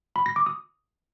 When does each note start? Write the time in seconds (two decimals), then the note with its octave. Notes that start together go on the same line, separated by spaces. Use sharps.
0.16 B5
0.26 A#6
0.36 D6
0.46 D#6